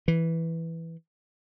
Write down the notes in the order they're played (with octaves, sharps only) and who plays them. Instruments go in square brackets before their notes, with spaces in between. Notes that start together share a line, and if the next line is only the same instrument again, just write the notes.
[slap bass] E3